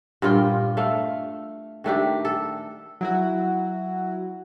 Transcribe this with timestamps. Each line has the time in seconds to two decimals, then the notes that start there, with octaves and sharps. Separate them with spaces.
0.22 G2 A#2 F4 G5
0.77 A3 A4 F5
1.84 D#3 A3 D4 G4
2.25 A4
3.01 F#3 E4 F#4